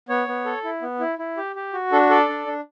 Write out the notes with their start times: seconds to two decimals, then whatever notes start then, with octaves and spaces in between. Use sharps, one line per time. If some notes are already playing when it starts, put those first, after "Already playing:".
0.09 B3 C#5
0.28 B3
0.45 A4
0.64 E4
0.82 B3
1.00 E4
1.19 E4
1.37 G4
1.56 G4
1.73 F#4
1.92 D4 A4
2.10 A4 D5
2.29 D4
2.47 D4